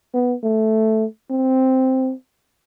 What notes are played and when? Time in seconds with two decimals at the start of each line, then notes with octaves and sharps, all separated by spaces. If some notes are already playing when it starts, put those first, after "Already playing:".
0.14 B3
0.43 A3
1.30 C4